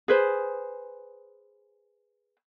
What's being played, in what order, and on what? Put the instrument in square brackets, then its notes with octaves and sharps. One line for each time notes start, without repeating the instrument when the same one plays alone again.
[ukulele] G#4 B4 C5